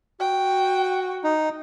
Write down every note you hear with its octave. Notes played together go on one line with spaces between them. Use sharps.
F#4 G5
D#4